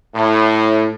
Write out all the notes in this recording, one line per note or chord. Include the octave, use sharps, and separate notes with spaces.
A2